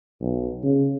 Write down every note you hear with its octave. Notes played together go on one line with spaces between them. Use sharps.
B1
C#3